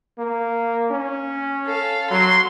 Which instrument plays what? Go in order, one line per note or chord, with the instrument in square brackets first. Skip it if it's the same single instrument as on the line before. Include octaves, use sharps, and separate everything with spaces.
[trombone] A#3
C#4
[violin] A4 F5
[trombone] F#3 [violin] C6